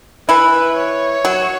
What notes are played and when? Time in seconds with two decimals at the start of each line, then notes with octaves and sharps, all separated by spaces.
0.29 E3 E4 B4
0.76 C#5
1.25 F#3 F#4